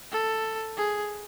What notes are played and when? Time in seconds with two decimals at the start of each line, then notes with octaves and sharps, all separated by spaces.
0.12 A4
0.77 G#4